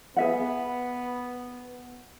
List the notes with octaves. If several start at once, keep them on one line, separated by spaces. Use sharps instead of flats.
B3 G#4 E5 F#5